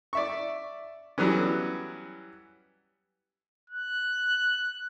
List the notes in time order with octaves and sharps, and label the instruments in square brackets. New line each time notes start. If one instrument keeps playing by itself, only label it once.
[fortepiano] D5 E5 C#6
E3 F#3 G3 B3 C#4
[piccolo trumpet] F#6